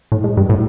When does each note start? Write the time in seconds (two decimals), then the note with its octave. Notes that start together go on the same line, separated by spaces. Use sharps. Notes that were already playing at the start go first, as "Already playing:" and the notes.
0.12 A2
0.24 G#2
0.37 G2
0.50 A2